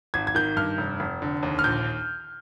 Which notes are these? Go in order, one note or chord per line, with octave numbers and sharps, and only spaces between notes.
G#1 G#6
G#6
D#3 G6
G2 F6
F1
F1
D3
D#2
F6
A#1 G6